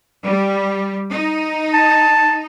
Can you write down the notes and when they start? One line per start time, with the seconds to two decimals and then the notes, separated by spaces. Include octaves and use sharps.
0.24 G3
1.11 D#4
1.74 A5